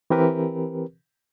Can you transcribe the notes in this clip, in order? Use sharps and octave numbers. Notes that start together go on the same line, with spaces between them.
E3 C4 G4 A#4 B4